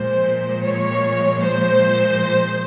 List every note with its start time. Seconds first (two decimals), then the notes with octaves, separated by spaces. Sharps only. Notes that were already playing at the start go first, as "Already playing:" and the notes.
Already playing: A#2 F3 G#3 C5
0.62 C#5
1.43 C5